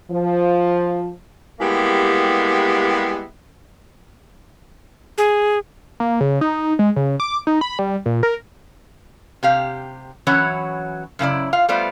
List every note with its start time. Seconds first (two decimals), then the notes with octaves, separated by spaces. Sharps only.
0.11 F3
1.60 G3 G#3 A#3 B3 E4 G4
5.18 G#4
6.00 A#3
6.21 C#3
6.41 D#4
6.79 G#3
6.96 C#3
7.20 D6
7.47 D#4
7.61 B5
7.79 G3
8.06 A#2
8.23 A#4
9.43 C3 G4 F5
10.27 E3 F#3 C#4 E4 F#4 C#5
11.19 F#2 C#3 E4 D5
11.53 F4 F5
11.69 G3 A3 B3 F4 C5 D5